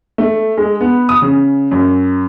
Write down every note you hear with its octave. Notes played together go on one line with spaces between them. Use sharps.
A3
G#3
B3
D#6
C#3
F#2